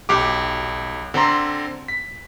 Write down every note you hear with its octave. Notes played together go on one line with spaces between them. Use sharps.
B1 G4 D6
D3 C4 A4 A#5 C6
B6